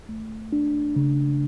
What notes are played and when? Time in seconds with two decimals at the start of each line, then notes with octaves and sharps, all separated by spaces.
0.09 A3
0.53 D4
0.96 C#3